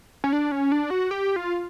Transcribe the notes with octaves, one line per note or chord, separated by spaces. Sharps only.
C#4
D4
C#4
D4
F#4
G4
F4